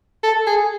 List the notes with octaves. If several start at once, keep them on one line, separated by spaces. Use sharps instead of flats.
A4
G#4